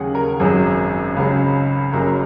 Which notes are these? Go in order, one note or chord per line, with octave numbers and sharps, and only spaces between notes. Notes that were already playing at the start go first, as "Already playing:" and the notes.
Already playing: D#2 C#3 F#3 G#4 F#5
A#4
G#1 F#2 F#3 G#4
C#2 C#3 F#3
F#1 F#2 F#3 A#4